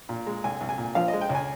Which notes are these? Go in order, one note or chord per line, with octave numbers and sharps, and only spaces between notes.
A#2
G#3
C2 G#5
C2
G#5
A#2
F3 F5
D#5
G#3
G5
C#2
G#5